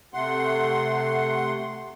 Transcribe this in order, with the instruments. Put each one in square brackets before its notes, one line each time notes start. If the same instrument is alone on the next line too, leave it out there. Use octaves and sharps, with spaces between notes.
[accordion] C3 A3 F#5 C6